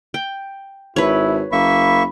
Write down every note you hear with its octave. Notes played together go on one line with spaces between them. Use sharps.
G5
G#1 E4 B4 C#5
F#1 A#3 E5 B5 C#6